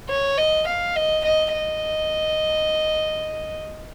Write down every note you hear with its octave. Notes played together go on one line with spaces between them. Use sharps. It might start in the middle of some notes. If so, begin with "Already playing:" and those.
C#5
D#5
F5
D#5
D#5
D#5